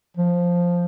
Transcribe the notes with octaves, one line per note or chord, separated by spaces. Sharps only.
F3